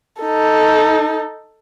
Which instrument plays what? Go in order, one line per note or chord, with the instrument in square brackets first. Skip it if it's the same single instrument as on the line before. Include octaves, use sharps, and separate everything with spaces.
[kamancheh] D#4 A4